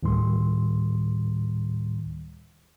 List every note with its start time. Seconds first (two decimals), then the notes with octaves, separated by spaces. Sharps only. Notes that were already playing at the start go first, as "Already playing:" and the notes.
0.03 D2 A2 D#3 G3 C6